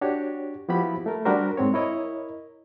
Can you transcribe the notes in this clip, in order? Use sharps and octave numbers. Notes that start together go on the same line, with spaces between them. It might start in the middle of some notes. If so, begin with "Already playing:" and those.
D4 F#4 G4 C#5
F3 B3 E4 F#4 G4 B5
A3 A#4
G3 D4 F#4 G4 A#4 C5
G#2 C4 C#5
E4 A#4 C#5 D#5